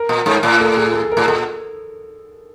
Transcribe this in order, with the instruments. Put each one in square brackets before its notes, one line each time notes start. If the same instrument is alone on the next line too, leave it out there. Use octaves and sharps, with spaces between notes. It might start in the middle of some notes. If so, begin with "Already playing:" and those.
Already playing: [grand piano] A#4
[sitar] A#2
G#2
A2
[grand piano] A4
G#4
A4
A#4
[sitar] A2
[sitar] A#2 [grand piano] A4